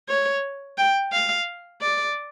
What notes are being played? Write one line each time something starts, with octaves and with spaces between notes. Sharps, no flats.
C#5
G5
F5
D5